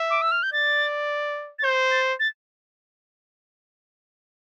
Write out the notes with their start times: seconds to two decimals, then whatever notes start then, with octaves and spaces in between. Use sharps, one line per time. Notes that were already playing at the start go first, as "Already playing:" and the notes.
Already playing: E5
0.10 D6
0.22 E6
0.31 F6
0.43 G6
0.53 D5 A6
1.59 A6
1.64 C5 G6
1.91 A6
2.20 A6